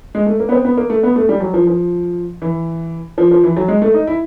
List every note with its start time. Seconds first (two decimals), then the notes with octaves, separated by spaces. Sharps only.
0.15 G#3
0.26 A3
0.40 A#3
0.49 B3
0.52 C4
0.65 B3
0.77 A#3
0.90 A3
1.03 B3
1.16 A3
1.29 G3
1.40 F#3
1.54 F3
1.67 F3
2.42 E3
3.18 F3
3.31 F3
3.43 E3
3.57 F#3
3.68 G#3
3.82 A3
3.94 D#4
4.07 E4